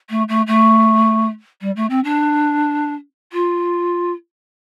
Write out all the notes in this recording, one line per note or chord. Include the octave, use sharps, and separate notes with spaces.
A3
A3
A3
G3
A3
C4
D4
F4